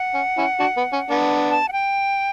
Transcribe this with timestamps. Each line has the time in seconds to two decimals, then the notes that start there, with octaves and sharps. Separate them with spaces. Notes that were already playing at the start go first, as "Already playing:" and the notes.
Already playing: F#5
0.14 C#4
0.37 C#4 E4
0.60 D4 F#4
0.77 B3
0.93 C#4
1.10 B3 D4
1.50 A5
1.68 F#5
1.72 G5